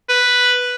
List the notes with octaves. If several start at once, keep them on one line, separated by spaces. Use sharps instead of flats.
B4